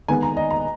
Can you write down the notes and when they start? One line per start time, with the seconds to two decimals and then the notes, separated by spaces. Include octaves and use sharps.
0.08 D#3 G#3 B3 G#5
0.23 A#5
0.37 D#5
0.51 A#5